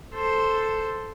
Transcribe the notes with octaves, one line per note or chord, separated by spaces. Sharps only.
A4 C5